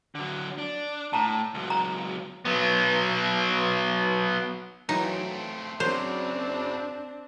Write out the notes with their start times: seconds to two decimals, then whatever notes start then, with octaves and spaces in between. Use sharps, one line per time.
0.15 D3 F#3
0.58 D4
1.13 A2 A5 A#5
1.54 C#2 F#3
1.70 A#5
2.45 F#3 B3
4.89 E3 F#3 A3 C4 D#4
5.80 F#2 C#3 F#3 C4 D4 C5